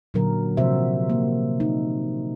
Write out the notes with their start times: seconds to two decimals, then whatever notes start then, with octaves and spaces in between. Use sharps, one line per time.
0.14 A#2 D3 F#3 A#4
0.57 C3 F3 A#3 F#4 C5 E5
1.10 A#3
1.60 D#4